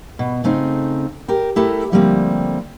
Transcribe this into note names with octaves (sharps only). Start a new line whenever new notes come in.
B2
C#3 A3 C4 D#4
G4 A#4 G5
A3 E4 G4 A4 A#4
D3 F3 G3 A3 A#3 C4